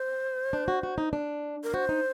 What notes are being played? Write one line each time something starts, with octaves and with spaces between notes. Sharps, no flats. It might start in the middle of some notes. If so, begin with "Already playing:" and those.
Already playing: C5
D4
F#4
F#4
D#4
D4
A#4
F#4 C5
D#4